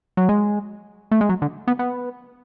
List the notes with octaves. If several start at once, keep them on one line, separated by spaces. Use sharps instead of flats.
F#3
G#3
A3
G#3
F#3
D3
B3
B3